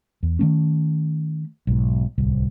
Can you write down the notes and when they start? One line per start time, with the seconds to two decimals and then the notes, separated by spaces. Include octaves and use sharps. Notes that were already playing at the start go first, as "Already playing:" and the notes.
0.23 E2
0.39 D#3 A3 C#4
1.67 B1 G#2
2.18 D1 C2